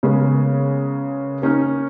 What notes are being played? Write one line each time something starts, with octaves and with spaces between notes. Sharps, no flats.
C#3 G#3 A#3 B3
A#3 C#4 D#4 F6